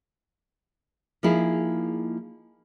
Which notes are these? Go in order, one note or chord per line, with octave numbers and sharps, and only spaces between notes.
F3 A#3 D#4 E4 G#4